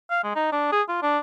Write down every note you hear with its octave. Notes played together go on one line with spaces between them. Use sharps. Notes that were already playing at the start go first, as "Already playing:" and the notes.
F5
G#3
D#4
D4
G#4
F4
D4